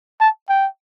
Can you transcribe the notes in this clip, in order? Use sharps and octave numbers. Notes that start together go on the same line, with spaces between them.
A5
G5